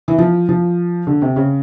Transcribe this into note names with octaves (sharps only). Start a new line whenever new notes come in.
E3
F3
F3
D3
C3
C#3